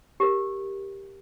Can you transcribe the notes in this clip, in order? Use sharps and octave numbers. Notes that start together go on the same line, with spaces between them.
G4 A#4